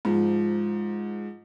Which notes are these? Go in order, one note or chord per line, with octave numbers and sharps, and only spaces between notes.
G#2 F3